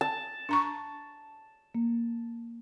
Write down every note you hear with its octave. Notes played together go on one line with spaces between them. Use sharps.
A5
D4 A#5 C#6
A#3